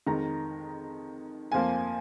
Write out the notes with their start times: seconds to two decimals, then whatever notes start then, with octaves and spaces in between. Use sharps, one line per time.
0.07 F2 D#3 G#3 A#5
1.52 F2 F3 A#3 G#5